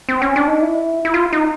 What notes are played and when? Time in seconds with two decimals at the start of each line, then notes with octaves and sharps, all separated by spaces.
0.09 C4
0.22 C#4
0.36 D4
0.48 D#4
0.62 E4
1.05 E4
1.14 F4
1.33 D#4